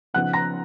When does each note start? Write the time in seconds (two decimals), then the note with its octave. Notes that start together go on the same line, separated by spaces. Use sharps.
0.14 C#3 F3 B3 D#4 F#5 F#6
0.33 A#5 A#6